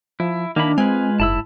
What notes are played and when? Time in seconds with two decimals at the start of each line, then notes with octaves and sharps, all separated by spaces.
0.20 F3 E4
0.56 D#3 A#3 D4 E4 B5 D6
0.78 G#3 C4 F4 G#4 B4 G#5
1.20 F#1 G#2 E4 A5 B5 E6